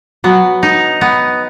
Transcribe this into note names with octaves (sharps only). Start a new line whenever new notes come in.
F#3 B3
D#4
B3